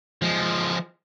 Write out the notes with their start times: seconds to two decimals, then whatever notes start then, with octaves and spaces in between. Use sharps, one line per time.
0.22 F3 G#3